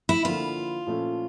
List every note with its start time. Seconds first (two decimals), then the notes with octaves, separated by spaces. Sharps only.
0.09 E4
0.25 D3 F3 A#3 F4
0.87 A#2 F3 A3 C#4